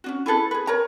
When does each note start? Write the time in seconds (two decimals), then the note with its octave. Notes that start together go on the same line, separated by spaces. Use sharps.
0.04 C#4 D4 F#4
0.26 E4 G#4 A4 B4
0.51 G#4 B4
0.67 A#4 C#5 A#5